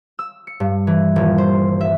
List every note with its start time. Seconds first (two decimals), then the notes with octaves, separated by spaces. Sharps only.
0.19 E6
0.47 C#7
0.60 G2
0.87 E3
1.16 D#1
1.38 C5
1.81 E5